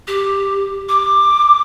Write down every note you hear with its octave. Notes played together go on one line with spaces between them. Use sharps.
G4
D6